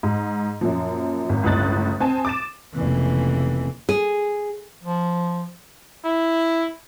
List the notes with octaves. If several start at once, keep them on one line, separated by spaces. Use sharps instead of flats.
G#2
F#2 A#2 F3
G#1
G1 C#2 A2 D#6 F#6 A6
C4 G#5 A5
D6 A6 E7
F1 C#3 E3 A#3 C4
G#4
F3
E4